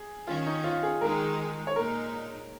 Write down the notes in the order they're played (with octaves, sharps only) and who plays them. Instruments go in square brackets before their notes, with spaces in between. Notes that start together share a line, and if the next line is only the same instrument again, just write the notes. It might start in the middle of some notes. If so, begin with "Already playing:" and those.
Already playing: [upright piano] G#4
[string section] D#3 C#4 [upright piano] F4
[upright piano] D#4
F4
G#4
[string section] D#3 G#3 D#4 [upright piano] A#4
[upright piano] C#5
[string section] A#2 G#3 D#4 [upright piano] A#4